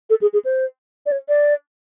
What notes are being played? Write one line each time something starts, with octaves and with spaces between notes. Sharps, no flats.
A4
G#4
G#4
C5
D5
C#5
D5